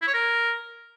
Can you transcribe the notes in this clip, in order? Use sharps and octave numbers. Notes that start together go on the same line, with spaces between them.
E4
C#5
A#4